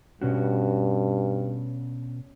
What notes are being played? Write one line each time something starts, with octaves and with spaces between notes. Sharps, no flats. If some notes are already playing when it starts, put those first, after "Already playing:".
G2 B2 C#4 F#4